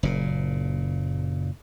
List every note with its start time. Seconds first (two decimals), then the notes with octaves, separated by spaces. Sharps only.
0.03 F#1 A#2